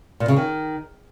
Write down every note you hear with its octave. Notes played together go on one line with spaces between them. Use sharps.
A#2
C#3
D#3